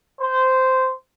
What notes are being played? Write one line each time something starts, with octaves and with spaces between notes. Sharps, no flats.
C5